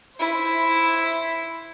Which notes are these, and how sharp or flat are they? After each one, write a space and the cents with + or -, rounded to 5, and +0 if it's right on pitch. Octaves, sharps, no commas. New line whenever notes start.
E4 +0 C5 +0